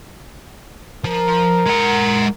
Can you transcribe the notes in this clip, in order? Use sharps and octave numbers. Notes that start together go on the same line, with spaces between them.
F3 A#4
G#3 F#5